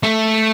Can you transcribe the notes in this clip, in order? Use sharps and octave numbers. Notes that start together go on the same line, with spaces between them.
A3